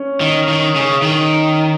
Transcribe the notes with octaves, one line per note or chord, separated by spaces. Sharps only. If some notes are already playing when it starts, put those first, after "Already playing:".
Already playing: C#4
D#3
D#3
C#3
D#3